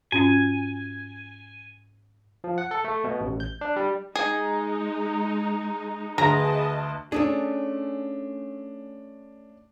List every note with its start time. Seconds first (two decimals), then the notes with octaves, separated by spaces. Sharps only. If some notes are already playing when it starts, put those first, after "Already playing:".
0.12 G#2 C#4 F4 G#5
2.44 F3
2.58 F#5
2.71 A4
2.85 A3
3.04 B2
3.21 A1
3.40 G6
3.61 D4
3.76 G3
4.16 G#3 D#4 G#4
6.18 D2 G#4 B4 D#5 A5 A#5
7.12 A3 C#4 D4 G#4